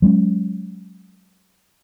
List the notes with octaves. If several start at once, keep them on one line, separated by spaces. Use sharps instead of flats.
F#3 G#3 C4 C#4